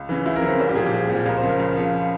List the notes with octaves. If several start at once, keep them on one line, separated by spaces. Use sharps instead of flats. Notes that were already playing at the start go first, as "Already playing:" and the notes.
Already playing: C#2
C#3 E3
C#2 E4
A#4
C#3 E3
C4
C2 C#4
G4
A#2 F3 G#4
G4
C2 G#4
A#2 F3
C#2 A#4
C5
C#3 F3
A#4
C#2
C#3 F3